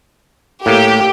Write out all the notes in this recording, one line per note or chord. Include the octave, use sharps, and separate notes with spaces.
A2 A#3 G4